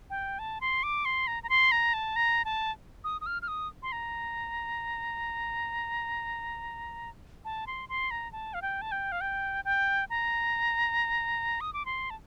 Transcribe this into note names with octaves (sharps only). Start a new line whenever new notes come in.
G5
A5
C6
D6
C6
A#5
A#5
C6
A#5
A5
A#5
A5
D#6
D#6
F6
F6
D#6
C6
A#5
A5
C6
C6
A#5
A5
F5
G5
A5
G5
F5
G5
G5
A#5
D#6
D6
C6
A5